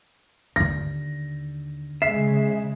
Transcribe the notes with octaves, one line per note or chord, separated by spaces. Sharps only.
D#2 D3 A#6
C#3 G#3 E5 C7